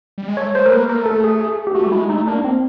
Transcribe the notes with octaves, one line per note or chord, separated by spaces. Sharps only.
G3
G#3
A3 C#5
G#3 C5
A3 A#4
A#3 B4
A3 A#4
A4
G#4
G#4
G4
A3 F#4
G3
G#3 E4
A3 D#4
A#3 D4
C4